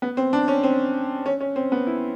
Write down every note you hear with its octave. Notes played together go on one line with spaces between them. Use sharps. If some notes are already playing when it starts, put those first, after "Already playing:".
B3
C4
D4
C#4
C4
C#4
C#4
C4
B3
E4